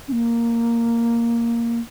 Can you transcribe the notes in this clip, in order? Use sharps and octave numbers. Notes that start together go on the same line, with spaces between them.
C#4
A#3